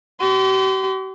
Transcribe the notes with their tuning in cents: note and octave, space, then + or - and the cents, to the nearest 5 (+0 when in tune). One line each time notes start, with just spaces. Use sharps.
G4 -45 C6 -35